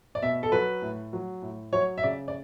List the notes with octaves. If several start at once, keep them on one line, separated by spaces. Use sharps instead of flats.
D5
B2 E5
A4
F#3 B4
A2
F#3
A2
F#3 C#5
E5
C#3 D5
D5